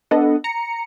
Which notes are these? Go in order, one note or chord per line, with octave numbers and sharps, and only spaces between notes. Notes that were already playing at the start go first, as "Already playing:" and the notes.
B3 D4 A4 D#5 F#5
A#5 C#7